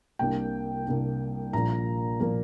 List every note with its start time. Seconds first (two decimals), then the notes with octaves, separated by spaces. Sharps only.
0.19 C2 C3 A#3 D4 G5
0.86 C2 C3 A#3 D4
1.53 A#1 A#2 F3 A#3 A#5
2.20 A#2 F3 A#3